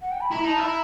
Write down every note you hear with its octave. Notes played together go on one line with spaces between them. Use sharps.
F#5
G5
B5
E4 A#5
D#4 A5
E4 A#5